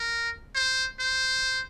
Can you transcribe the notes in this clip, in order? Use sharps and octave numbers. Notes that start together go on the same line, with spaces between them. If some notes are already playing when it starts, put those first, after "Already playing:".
Already playing: A#4
C5
C5